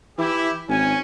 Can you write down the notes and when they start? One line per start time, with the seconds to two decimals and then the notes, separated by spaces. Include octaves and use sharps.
0.19 E3 E4 G4
0.69 G#1 C#4 G#5